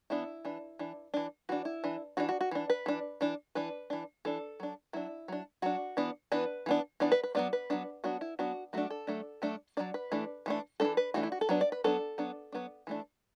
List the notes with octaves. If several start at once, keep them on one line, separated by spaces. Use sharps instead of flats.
E3 B3 D4 E4
E3 D4
E3 D4
E3 D4
E3 D4 F#4
E4
E3 D4
E3 D4 F#4
F#4
F#4
E3 D4
B4
E3 D4
E3 D4
E3 D4 B4
E3 D4
E3 D4 A4
F#3 D4
F#3 D4 E4
F#3 D4
F#3 D4 F#4
E3 B3 D4
E3 B3 D4 B4
E3 B3 D4
E3 B3 D4 D5
B4
B4
F#3 B3 D4 D5
B4
F#3 B3 D4
F#3 B3 D4 F#4
E4
F#3 B3 D4 F#4
F#3 A3 D4 F#4
A4
F#3 A3 D4
F#3 A3 D4
F#3 A3 D4 D5
B4
E3 A3 D4
E3 A3 D4
E3 A3 D4 A4
B4
E3 A3 D4 F#4
E4
F#4
A4
F#3 B3 D4 B4
D5
B4
F#3 B3 D4 A4
F#3 B3 D4
F#3 B3 D4
E3 A3 D4